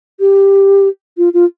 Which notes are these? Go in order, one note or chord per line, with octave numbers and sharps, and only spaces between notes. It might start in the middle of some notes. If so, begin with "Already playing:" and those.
G4
F4
F4